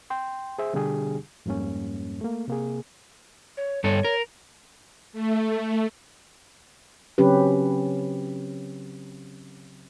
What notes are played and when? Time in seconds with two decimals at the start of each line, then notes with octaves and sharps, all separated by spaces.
0.10 G5 C6
0.59 G#4 C5 E5
0.73 B2 D3 G3 D4 G4 G#4
1.46 F2 G#2 G3 A#3 C#4
2.21 A3 A#3
2.48 C3 A#3 G#4
3.57 C#5
3.84 G2 A4 C#5
4.04 A#4
5.13 A3
7.18 C#3 F#3 C4 C#4 G4 B4